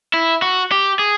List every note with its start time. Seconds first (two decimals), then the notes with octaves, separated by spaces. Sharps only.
0.14 E4
0.42 F#4
0.71 G4
0.99 G#4